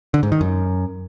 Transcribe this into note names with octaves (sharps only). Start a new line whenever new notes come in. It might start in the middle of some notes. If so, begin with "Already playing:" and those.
D3
G#2
D#3
F#2